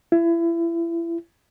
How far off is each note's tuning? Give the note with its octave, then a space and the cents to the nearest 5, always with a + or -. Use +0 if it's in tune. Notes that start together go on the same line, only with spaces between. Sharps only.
E4 +30